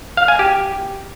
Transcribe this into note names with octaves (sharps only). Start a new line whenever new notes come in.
F5
G#5
G4